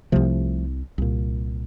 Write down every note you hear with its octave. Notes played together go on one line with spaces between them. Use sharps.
C2 C3 F3 A3
C2 A#2